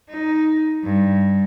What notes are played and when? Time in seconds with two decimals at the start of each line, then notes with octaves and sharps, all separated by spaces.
0.10 D#4
0.84 G2